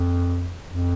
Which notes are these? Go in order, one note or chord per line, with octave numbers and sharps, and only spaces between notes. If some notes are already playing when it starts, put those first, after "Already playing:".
Already playing: F2
F2